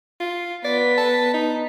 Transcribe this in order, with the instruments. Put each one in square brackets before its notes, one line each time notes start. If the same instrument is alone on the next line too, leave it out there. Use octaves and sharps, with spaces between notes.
[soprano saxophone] F4
[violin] B3 B6 [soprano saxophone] D5
[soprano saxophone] A5
D#4